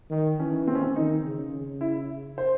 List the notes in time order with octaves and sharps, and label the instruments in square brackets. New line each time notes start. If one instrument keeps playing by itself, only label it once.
[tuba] D#3
[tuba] E3 [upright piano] C#4
[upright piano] C4
C#4
C4
[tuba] D#3 [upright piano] D#4
[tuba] C#3
C#3
[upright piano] E4
C5